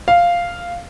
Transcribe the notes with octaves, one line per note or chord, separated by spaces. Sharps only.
F5